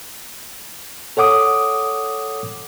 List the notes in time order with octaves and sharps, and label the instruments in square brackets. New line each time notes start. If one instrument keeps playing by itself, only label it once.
[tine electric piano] A4 C#5 F#5 D6 D#6